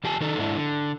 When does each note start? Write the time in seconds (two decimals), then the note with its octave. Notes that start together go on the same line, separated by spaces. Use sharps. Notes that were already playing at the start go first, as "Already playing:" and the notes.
0.04 E2 G4 G#5 A5
0.20 D#3 D#4 A4
0.38 G#2 D4 E4
0.57 D3